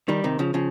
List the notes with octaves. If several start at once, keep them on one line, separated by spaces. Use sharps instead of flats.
D#3 G3
C3 D#3
C#3 F3
C#3 F3